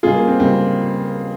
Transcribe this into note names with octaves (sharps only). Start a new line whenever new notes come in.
C#2 C#3 G3 F4 G#4
A#3
C4
C#2 C#3 G3 C4